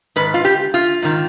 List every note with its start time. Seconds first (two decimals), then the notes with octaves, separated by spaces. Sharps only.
0.16 G#2 D#3 B4
0.34 F4
0.45 G4
0.74 F4
1.02 G#2 D#3